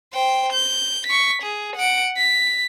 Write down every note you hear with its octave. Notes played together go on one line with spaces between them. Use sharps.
C5 G5
G6
C#6 B6
G#4
F#5 D7
B6